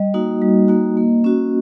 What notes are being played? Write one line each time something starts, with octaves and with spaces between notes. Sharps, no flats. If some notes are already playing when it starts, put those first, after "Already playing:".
Already playing: G3 D#5
A#3 D#4 F#4
G3
A#3 D#4 F#4
A#3
C#4 F#4